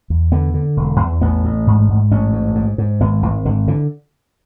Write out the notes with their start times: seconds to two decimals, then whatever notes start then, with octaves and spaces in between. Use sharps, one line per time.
0.10 E2
0.32 D3 B3
0.54 D3
0.77 E1
1.00 E2
1.21 A1 B3
1.44 A1
1.67 G#2
1.89 G#2
2.11 A1 C#4
2.33 G#2
2.55 G#2
2.78 G#2
3.00 G#1 B3
3.22 G#1 E3
3.45 G#1 D3
3.68 D3 E3